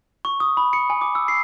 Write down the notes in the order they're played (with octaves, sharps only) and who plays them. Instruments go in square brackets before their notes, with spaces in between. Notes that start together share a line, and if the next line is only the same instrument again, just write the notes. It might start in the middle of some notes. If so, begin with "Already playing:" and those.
[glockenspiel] C#6
D#6
B5
C#7
G#5
D6
E6
C7